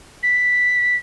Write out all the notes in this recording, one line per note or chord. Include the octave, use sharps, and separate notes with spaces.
B6